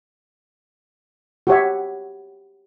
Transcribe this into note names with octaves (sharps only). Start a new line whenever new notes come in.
F#4 G4 C#5 E5